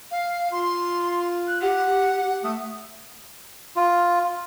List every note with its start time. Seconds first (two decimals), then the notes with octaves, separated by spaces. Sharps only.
0.11 F5
0.52 F4 C6
1.47 F#6
1.61 G4 F#5
2.44 A3 D#6
3.76 F4